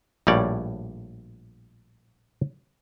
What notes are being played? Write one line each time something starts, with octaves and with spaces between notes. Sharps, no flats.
A#1 A2 G3 C#5 D5